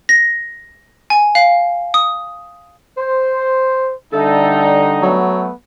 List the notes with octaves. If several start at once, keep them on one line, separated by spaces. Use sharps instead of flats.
A#6
G#5
F5
D#6
C5
D3 G3 D#4 A4 E5 A5
F#3 A3 B3